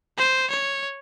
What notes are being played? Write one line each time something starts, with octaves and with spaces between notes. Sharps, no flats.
C5
C#5